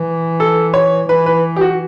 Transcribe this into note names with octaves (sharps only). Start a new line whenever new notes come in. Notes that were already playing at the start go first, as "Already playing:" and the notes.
Already playing: E3
A4
C#5
E3 B4
B4
G4
F#4